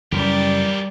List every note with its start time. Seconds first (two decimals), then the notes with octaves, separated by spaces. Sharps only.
0.12 F#2 C#3 E3 G3 G4 A#4 D5